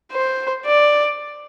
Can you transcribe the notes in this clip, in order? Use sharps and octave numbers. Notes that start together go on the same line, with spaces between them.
C5
D5